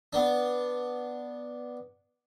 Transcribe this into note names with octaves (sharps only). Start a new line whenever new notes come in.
B3 D4